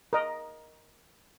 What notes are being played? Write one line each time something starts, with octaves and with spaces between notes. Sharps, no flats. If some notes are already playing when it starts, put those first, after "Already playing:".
A#4 D#5